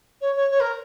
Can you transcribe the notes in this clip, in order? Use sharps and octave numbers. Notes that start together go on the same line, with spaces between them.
C#5
C#5
C#5
A#4